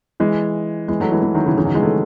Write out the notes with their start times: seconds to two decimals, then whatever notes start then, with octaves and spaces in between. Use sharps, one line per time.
0.20 E3 G#3
0.88 E3 G#3
1.00 F#3 A3
1.12 E3 G#3
1.23 E3 G#3
1.34 D#3 F#3
1.46 C#3 E3
1.57 C#3 E3
1.65 D#3 F#3
1.75 E3 G#3
1.83 F#3 A3